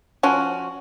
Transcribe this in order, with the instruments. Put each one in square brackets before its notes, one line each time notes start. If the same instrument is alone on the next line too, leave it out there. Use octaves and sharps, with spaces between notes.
[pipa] F3 C#4 F#4